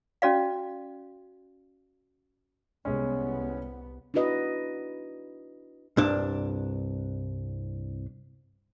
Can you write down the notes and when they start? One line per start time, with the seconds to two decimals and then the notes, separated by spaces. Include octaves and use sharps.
0.22 C#4 F#4 D5 F5
2.85 C2 G#3 B3 C#4
4.14 D4 E4 F#4 B4 D#5
5.97 C2 G2 D4